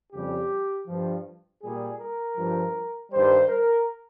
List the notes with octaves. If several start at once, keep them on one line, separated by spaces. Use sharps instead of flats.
F2 C#3 G3 G4
G2 F3
A#2 G3 G#4
A#4
G2 F3
G2 D#3 G3 C5
A#4